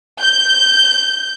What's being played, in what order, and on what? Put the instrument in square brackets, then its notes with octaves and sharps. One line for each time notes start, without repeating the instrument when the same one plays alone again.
[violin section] G6